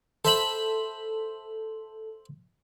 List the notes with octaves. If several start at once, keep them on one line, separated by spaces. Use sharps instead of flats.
A4 C5 E5 B5